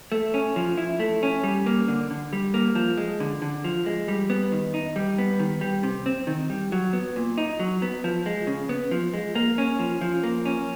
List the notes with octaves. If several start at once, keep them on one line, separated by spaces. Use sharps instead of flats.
A3
C#4
F3
E4
A3
C#4
G3
A#3
D3
D3
G3
A#3
F3
G#3
D3
D3
F3
G#3
G3
B3
D#3
D#4
G3
B3
D#3
G3
C3
C4
D#3
G3
F#3
B3
A#2
D#4
F#3
B3
F3
G#3
C#3
B3
F3
G#3
A#3
C#4
F3
F3
A#3
C#4